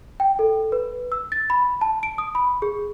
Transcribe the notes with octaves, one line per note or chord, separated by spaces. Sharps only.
G5
A4
B4
E6
A6
B5
A5
D7
D#6
B5
G#4